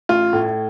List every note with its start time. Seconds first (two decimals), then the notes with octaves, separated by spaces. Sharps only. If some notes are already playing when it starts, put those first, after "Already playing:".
0.09 A1 F4
0.33 A2